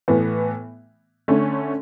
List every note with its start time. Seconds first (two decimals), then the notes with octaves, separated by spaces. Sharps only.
0.08 A2 E3 B3
1.28 D3 A3 C#4